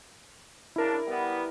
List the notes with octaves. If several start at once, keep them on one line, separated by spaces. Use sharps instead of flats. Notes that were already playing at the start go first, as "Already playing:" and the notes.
C#3 D4 E4 A#4
G3 B3